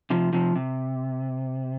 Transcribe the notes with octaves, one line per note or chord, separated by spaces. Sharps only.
C3 F3
C3 F3
C3